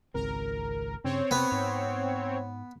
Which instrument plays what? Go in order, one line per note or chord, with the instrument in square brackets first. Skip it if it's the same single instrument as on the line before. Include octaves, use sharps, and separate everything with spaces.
[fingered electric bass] G#1 C#2 C4 [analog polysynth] A#4
[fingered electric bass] G2 C#3 C#4 [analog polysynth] C4 C#5
[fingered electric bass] C3 [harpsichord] B3
[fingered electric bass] G#2